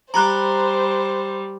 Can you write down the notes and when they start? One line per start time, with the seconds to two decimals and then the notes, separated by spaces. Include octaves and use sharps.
0.14 G3 C5 A#5 B5 F#6